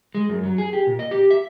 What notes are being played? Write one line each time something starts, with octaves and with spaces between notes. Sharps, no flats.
G#3
F#2
F#3
G#4
G4
A#2
D#5
G4
E5